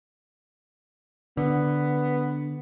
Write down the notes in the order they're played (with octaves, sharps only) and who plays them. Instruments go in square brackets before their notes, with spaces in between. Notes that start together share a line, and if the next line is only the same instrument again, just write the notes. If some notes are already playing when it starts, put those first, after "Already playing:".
[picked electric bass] D3 [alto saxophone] B3